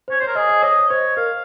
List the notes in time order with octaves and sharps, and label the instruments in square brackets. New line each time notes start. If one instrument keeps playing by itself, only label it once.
[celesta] C5 [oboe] C#5
[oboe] C5 [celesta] C#5
[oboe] A#4
[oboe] G#4 [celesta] D#5
[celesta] D#5
[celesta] C#5 [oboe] D#5
[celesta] C#5
[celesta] C5 [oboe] C#5
[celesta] A#4 [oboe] F5